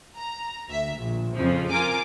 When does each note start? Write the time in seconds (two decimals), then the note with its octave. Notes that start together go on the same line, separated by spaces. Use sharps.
0.17 A#5
0.68 D2 E5
0.97 A#1
1.32 F2 C#3 F3
1.70 F4 A#4 G#5 D6